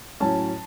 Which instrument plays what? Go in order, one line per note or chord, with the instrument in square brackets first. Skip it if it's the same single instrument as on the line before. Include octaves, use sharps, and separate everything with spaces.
[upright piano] A2 F#3 C#4 A5